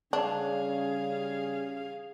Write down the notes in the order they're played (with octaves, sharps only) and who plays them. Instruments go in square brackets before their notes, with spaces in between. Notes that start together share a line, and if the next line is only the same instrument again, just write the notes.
[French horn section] C#3 G3 C#4 [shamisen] D4 [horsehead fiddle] G#4 F5